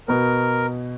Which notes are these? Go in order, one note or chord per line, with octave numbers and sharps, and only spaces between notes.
B2 B3 A#4